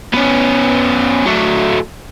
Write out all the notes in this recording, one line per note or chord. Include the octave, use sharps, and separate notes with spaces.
B3 C#4
F#3 A3